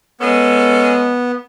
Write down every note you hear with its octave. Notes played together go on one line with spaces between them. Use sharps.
G#3 B3 C#4 A4